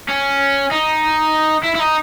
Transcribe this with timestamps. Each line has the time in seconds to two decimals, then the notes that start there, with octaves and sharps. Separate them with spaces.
0.09 C#4
0.71 D#4
1.64 E4
1.75 E4
1.80 D#4